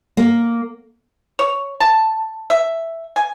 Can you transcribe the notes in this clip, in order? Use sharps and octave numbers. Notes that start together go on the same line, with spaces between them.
A#3
C#5
A5
E5
G#5